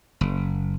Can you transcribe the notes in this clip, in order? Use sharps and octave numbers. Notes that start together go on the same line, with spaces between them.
F#1